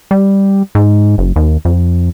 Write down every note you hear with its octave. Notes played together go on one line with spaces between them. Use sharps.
G3
G#2
F#1
D#2
F2